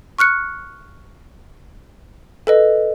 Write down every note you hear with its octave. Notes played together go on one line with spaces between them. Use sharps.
C#6 F6 F#6 C#7
A4 B4 D#5